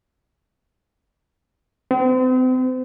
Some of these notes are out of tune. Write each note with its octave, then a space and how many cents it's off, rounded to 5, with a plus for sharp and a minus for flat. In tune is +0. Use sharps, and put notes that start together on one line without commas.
C4 -40